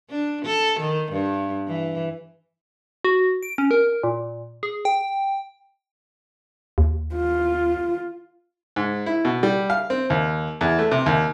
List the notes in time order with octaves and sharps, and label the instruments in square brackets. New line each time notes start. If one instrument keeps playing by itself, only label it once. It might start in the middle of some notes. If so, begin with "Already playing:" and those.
[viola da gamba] D4
A4
D#3
G2
E3
[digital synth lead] F#4
D7
C#4
A#4
A#2
G#4
G5
[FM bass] D#2
[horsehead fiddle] F4
[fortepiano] G#2
E4
B2
G3
F5
C4
D#2
E2
A3
C3
D#2